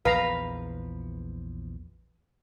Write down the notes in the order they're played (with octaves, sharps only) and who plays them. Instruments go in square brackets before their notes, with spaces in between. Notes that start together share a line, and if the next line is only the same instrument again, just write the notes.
[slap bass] A#1 E2 F3 [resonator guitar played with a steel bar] B4 [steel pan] F5 A#5